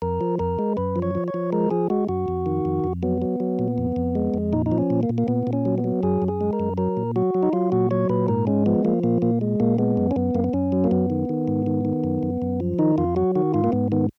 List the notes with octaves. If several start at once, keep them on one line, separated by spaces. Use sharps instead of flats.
F2 A#4
F3
F2 A#4
G#3
F#2 B4
F3
C#5
F3
C#5
F3
G#3 A#4
F3 G#4
G#3 F#4
F#2 F#4
F2
D#3
F2
F2
F#3 B3
F#3
F#3
A#2
F2
F2
G#3
F2
A#2 D#4
D#4
F3
C#4
A#2
A#3
A#2
A#3
A#2 B3
A#2
C#4
F#3
B3
F#3
F#2 G#4
F#2
G#4
G#3
A#4
F#2
F#3 A#4
A#2
F#3 F#4
F#3
D#4
F#3 F4
A#2 F#4
F#3 C#5
A#2 B4
G#2 A#4
G#3 C#4
F3 B3
F3 A#3
A#2 A#3
A#2 A#3
G#3
A#2 A#3
G#3 B3
F#2
C#4
F#2 B3
F#2 A#3
B3
F#2 C#4
F#3
A#3
F#2 B3
D#3
D#3
G#2
D#3
D#3
F#2
F#2
F#2
F3
D#3 D#4
F2 F4
F#3 F#4
D#3 F#4
G#2 F4
A#3
G#2 B3
D#3 B3